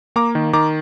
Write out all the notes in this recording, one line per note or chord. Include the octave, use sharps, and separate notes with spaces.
A#3 A#5 D6
D#3
D#3 A#5 D6